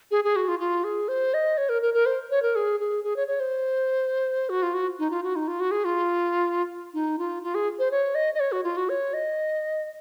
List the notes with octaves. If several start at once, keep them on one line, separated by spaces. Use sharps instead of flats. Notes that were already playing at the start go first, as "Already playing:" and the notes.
G#4
G#4
F#4
F4
F4
G#4
C5
D#5
C#5
A#4
A#4
A#4
C5
C#5
A#4
G#4
G#4
G#4
C#5
C#5
C5
F#4
F4
F#4
D#4
F4
F#4
D#4
F4
F#4
G#4
F4
D#4
F4
F4
G#4
C5
C#5
D#5
D#5
C#5
F#4
F4
F#4
C#5
D#5